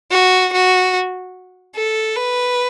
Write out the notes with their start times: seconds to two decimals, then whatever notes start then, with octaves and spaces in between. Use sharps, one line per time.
0.11 F#4
0.53 F#4
1.75 A4
2.16 B4